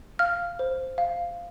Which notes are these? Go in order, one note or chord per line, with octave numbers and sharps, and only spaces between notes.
F5 F6
C5
F5